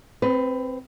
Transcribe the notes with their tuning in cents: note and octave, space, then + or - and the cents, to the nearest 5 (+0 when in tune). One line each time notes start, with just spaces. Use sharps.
C4 +0 B4 +20